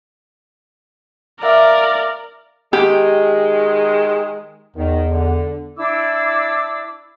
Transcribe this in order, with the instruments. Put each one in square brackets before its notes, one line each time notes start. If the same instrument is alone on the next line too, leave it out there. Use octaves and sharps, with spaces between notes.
[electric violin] A#4 D5 [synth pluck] E5 F5 D6
[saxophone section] D#3 G#3 [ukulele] G4
[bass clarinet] E2 [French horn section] D#3
[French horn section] D3
[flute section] D4 E4 D6 E6